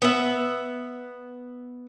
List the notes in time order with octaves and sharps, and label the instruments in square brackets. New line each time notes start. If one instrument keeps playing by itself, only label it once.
[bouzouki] B3 E5